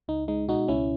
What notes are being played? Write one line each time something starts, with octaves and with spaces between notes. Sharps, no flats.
C#2 D#4
G#3 D#4
B2 D#4 F#4
C#2 C#4 E4